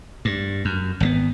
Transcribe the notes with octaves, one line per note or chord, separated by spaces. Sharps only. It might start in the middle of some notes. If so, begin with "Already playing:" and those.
G2
F#2
G#1 D3 B3